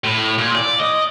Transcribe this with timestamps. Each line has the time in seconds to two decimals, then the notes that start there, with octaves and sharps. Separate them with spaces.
0.04 A2
0.38 A#2
0.55 D5
0.80 D#5